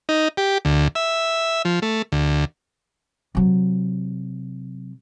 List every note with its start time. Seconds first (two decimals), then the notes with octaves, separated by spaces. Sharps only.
0.09 D#4
0.37 G4
0.65 D2
0.95 E5
1.65 F3
1.82 A3
2.12 D2
3.35 C3 F#3